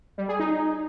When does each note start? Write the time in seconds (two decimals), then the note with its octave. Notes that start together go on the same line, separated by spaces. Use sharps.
0.18 G3
0.29 G#4
0.40 D#4